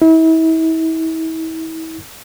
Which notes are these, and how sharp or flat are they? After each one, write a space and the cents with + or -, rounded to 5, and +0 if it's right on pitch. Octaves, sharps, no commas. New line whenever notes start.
E4 -35